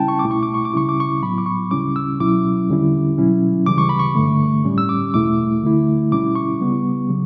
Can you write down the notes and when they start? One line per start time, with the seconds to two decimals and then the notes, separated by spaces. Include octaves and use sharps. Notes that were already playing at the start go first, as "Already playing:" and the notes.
Already playing: C#3 G3 C#4 E4 G5 A5
0.08 C#6
0.19 D6
0.25 C#2 B2 A3 E4
0.31 C#6
0.43 D6
0.54 C#6
0.65 D6
0.74 C#2 C#3 G3 C#4 E4 C#6
0.89 D6
1.00 C#6
1.22 A2 F#3 B3 B5
1.38 D6
1.46 C#6
1.71 D2 C#3 G3 C#4 E4 D6
1.96 E6
2.20 C#2 B2 F#3 C#4 E4 D6
2.69 E2 D3 G3 C#4 E4
3.18 B2 F#3 C#4 E4
3.66 D2 C#3 E3 G3 D6
3.78 C#6
3.89 B5
3.99 C#6
4.15 G2 D3 A3
4.64 A2 G3 C#4
4.78 E6
4.89 D6
5.14 E2 B2 A3 E4 D6
5.63 D2 D3 A3 E4
6.12 B2 G3 C#4 E4 D6
6.36 C#6
6.60 C#2 C#3 G3 B3
7.09 C#3 F#3